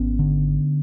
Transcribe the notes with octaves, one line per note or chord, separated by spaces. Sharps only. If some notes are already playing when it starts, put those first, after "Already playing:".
Already playing: G#1 B3 C#4
D3